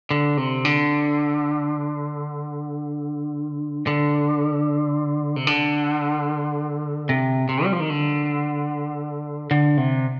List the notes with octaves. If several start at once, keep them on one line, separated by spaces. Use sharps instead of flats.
D3
C3
D3
D3
C3
D3
C3
C3
G3
F3
D#3
D3
D3
C3